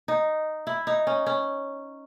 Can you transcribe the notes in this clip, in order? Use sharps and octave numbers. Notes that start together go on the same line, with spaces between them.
D#4
E4
D#4
C#4
C#4